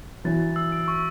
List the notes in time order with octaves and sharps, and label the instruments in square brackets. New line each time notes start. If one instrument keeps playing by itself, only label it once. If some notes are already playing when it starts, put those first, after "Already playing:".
[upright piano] E3 F#3 [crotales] A6
[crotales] A6
E6
D7
C#6